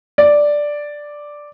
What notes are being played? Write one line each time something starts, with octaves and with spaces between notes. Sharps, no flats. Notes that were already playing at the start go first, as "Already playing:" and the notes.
D5